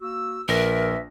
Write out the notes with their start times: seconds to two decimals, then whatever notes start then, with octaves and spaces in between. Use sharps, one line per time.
0.01 A#3 F#4 E6
0.48 A#1 A#4 B4 E5 A#6